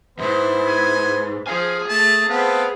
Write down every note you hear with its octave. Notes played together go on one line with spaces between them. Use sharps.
E2 G#2 B3 E4 C5
G#5
F3 G#4 F5 G#5
A3 A5
B3 C4 B4 F5 A5